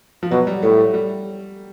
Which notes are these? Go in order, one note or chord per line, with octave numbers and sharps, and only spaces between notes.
F3
B2 F#3
G3
A2 A3
A3
G3